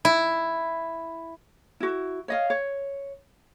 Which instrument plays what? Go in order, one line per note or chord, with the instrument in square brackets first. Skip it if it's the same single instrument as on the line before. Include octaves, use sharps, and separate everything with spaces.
[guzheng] E4
[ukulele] E4 F#4
C#5 D#5 F5
C#5